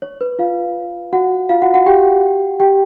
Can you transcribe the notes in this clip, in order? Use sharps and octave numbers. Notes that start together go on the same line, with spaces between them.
C#5
B4
F4 F5
F#4 F#5
F4 F5
F#4 F#5
F#4 F#5
G4 G5
G4 G5